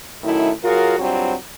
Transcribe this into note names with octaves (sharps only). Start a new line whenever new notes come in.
F#2 D#3 A3 E4
F#3 F4 F#4 G#4 A#4
G2 F#3 C4 F4 F#4